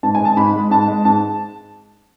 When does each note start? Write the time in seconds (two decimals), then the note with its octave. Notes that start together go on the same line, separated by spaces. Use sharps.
0.03 G#2 A5
0.15 G#5
0.21 G#3 A5
0.37 G#2 B5
0.54 G#3
0.71 G#2 A5
0.88 G#3
1.05 G#2 A5